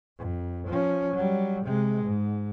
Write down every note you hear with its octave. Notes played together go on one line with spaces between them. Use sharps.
F2
F3 C#4
F#3 G3
C3 G#3
G#2